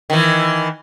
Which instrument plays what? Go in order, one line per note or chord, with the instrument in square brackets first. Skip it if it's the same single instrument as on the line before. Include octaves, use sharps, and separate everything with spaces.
[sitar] D#3 E3